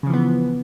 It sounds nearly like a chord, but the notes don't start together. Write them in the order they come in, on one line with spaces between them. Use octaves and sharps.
C#3 F3 E3 B3